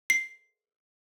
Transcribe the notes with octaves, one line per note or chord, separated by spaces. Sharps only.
C7